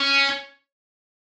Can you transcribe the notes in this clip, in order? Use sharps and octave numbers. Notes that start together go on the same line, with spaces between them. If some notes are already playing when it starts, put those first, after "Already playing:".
Already playing: C#4